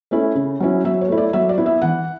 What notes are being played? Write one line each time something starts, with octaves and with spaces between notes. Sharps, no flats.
A3 C#4 E4
C#3
F#3 C#4 E4
F#3 E5
C#5
A3 E4
D5
F#3 E5
D5
B3 E4
E5
E3 F#5